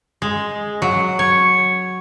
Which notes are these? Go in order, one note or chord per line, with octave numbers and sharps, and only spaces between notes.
G#3
F#3
C#5